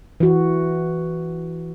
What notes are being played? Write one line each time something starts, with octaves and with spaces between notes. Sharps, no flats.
E3 F#4